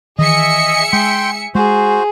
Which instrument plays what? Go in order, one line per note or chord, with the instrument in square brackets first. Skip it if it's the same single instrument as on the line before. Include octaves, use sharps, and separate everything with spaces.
[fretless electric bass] D#3 E3 [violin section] G#4 E5 C#7 [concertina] D#5
[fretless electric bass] G#3 [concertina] G5 C6
[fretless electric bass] G#3 [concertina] F#4 C5 [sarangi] G#4